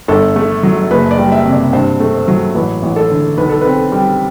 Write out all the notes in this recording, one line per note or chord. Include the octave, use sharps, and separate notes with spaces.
G1 A4
A3
F#3
F#1 B4
D5
G3
E5
C3
D5
G2 C5
A3
C5
F#3
A1 B4
A1
A4
D3
B1 B4
A4
C4 B4
G3